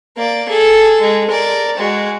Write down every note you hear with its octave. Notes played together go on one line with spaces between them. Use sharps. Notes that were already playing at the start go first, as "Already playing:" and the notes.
A#3 D5
G#4 A4
G#3
A#4 D5
G#3 F#4